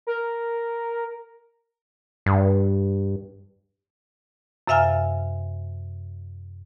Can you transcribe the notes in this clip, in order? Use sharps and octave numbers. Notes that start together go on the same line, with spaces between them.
A#4
G2
F#2 C3 E5 F5 G#5 F6